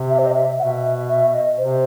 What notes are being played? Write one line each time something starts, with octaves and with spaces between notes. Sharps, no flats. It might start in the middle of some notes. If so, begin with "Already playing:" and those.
Already playing: C3
E5
C5
D#5
E5
B2 E5 F#5
E5
D#5
C3 C5